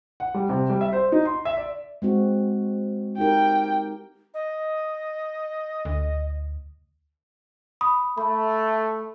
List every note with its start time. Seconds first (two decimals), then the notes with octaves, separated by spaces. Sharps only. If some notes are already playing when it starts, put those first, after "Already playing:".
0.20 F#5
0.34 G3
0.49 C3
0.70 G3
0.81 E5
0.93 C5
1.12 D#4
1.25 C6
1.45 E5
1.57 D5
2.02 G#3 C4 F#4
3.18 D#4 G4 A#4 G5
4.34 D#5
5.85 D2
7.81 B5 D#6
8.18 A3 B5